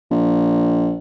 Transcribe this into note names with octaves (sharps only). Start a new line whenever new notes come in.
A#1